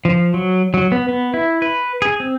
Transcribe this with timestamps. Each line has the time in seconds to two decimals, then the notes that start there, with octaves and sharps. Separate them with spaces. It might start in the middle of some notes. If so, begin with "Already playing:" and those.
0.05 F3
0.34 F#3
0.74 F#3
0.92 B3
1.09 B3
1.34 E4
1.62 B4
2.02 G#4
2.20 C4